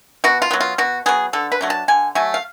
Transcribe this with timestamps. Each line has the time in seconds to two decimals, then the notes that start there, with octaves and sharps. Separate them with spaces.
0.24 B2 F#4
0.42 F4
0.51 F#3 B3
0.60 F4
0.78 B2 F#4
1.06 F#3 B3 G#4
1.33 D3 A4
1.52 B4
1.61 F#3 A3 D4
1.70 A5
1.88 D3 G#5
2.15 F#3 A3 G#5
2.34 F5